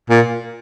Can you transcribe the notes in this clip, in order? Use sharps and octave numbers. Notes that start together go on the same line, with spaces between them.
A#2